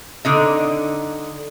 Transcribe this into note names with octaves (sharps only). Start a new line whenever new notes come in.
D3 D#4 D#5